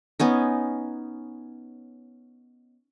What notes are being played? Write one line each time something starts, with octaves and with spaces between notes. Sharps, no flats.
B3 C#4 D#4